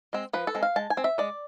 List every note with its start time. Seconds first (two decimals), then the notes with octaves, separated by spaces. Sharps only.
0.13 G#3 C4
0.33 F3 B4
0.47 A4
0.55 G#3 C4
0.63 F5
0.76 G#3 A5
0.90 G#5
0.97 C4
1.04 E5
1.18 G#3 D5